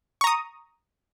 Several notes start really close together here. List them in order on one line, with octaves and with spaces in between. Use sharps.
C#6 A#5 D#6